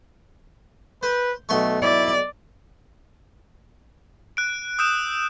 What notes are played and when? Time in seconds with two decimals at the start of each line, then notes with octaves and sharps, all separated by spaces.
1.03 B4 C5
1.49 B1 A3 C6 C#6
1.82 E4 D5
4.37 F#6 D7
4.79 D#6 E6 G6 D7 E7